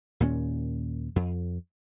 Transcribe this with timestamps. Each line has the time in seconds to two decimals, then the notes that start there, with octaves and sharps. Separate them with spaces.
0.20 D#2 A#2 G3 C#4
1.16 F2